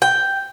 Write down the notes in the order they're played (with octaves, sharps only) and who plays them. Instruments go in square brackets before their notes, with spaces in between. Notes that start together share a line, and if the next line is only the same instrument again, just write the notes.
[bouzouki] G5